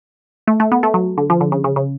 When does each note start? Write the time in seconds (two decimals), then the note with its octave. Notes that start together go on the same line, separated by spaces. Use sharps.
0.47 A3
0.60 A3
0.72 B3
0.83 A3
0.94 F#3
1.18 D3
1.30 F3
1.41 D3
1.52 C#3
1.64 C#3
1.76 C#3